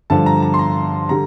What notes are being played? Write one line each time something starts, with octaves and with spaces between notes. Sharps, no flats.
G2 D3 F3 A5
A#5
A#5
C6
A#5
D3 G3 A#5